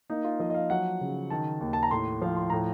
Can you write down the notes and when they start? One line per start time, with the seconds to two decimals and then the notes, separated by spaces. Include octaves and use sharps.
0.10 A#3 D#4
0.24 F4
0.40 F3 D#5
0.50 D#5
0.54 F5
0.70 F#3 F#5
1.01 C#3
1.30 D#3 A5
1.61 D#2
1.73 A5
1.83 A#5
1.91 A2 C6
2.22 F3 F5
2.36 C6
2.50 A2 A#5